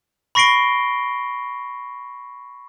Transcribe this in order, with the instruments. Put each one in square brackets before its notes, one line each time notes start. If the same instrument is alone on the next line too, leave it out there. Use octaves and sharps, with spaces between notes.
[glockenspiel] B5 C#6 A#6 C7 D7 G7